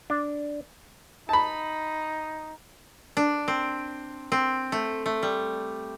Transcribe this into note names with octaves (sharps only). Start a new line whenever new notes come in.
D4
D#4 A5 B5
D4
C4
C4
A3
A3
G3